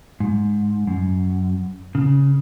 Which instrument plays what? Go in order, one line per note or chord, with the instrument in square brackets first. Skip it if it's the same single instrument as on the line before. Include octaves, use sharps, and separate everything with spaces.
[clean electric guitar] G#2
F#2
C#3